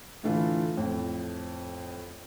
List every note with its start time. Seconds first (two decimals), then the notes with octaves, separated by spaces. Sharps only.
0.23 A2 D3 E3 A3 F4
0.77 F2 A2